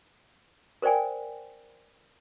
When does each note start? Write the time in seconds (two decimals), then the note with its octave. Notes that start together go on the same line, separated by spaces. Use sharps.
0.82 A#4 C5 D5 G5 G#5